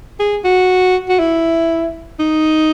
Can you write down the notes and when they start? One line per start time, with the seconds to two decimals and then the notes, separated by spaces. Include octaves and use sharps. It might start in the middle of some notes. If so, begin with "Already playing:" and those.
0.20 G#4
0.44 F#4
1.09 F#4
1.19 E4
2.19 D#4